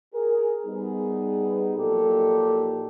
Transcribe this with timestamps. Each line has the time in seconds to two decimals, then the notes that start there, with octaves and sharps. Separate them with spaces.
0.14 G#4 A#4
0.65 G3 B3 D#4 G#4
1.78 A#2 F3 F#3 D#4 G4 A4